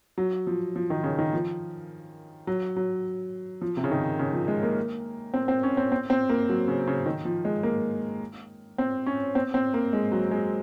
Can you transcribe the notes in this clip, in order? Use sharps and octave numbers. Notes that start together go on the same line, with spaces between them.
F#3
F3
F3
D#3
C#3
D#3
F3
F#3
F#3
F3
C3
C#3
D#3
C#3
F3
G#3
A#3
C4
C4
C#4
C4
C4
C4
A#3
F#3
C#3
C#3
D#3
F3
G#3
A#3
C4
C#4
C4
C4
A#3
G#3
F#3
G#3